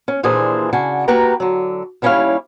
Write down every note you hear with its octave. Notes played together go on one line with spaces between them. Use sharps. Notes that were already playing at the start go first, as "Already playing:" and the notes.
C#4
D#2 A#2 E3 D4 G#4 C5
C#3 D4 F#4 G#5
A#3 F#4 G4 B4 G5 A#5
D3 F#3
D#2 G3 C#4 E4 C#5 F5